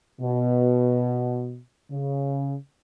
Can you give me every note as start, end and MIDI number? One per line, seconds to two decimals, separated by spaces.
0.22 1.59 47
1.92 2.55 49